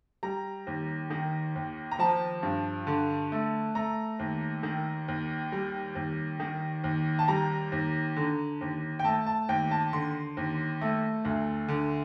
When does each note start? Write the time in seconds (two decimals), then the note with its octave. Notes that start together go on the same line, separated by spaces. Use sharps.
0.23 G3 A#5
0.67 D#2
1.10 D#3
1.56 D#2
1.91 A#5
1.99 F3 A5
2.43 G2
2.87 D3
3.32 A3
3.75 A3 A#5
4.19 D#2
4.63 D#3
5.08 D#2
5.52 G3
5.95 D#2
6.40 D#3
6.84 D#2
7.19 A5
7.28 G3 A#5
7.72 D#2
8.16 D3
8.61 D#2
8.99 G5
9.04 A3 A5
9.26 A5
9.49 D#2 G5
9.71 A5
9.93 D3 C6
10.37 D#2
10.81 A3
11.25 D2
11.68 D3